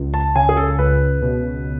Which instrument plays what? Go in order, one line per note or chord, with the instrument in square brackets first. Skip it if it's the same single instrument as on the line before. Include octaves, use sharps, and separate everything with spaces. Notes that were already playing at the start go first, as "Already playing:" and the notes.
Already playing: [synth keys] C#2
[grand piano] A5
[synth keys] C#3 [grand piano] G#5
[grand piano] G#4
A4
[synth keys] C#2 [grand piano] B4
[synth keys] B2